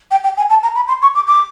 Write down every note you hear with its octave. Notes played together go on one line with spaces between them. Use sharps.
G5
G5
G#5
A5
A#5
B5
C6
C#6
D6
D6